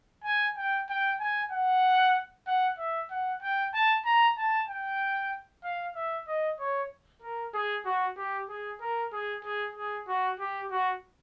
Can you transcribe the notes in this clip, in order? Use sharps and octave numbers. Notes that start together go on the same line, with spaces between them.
G#5
G5
G5
G#5
F#5
F#5
E5
F#5
G5
A5
A#5
A5
G5
F5
E5
D#5
C#5
A#4
G#4
F#4
G4
G#4
A#4
G#4
G#4
G#4
F#4
G4
F#4